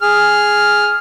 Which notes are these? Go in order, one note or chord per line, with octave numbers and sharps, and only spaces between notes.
G#4 F6